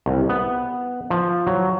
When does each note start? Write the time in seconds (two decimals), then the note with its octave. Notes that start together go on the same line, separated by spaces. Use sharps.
0.06 C2
0.29 B3
1.10 F3
1.47 F#3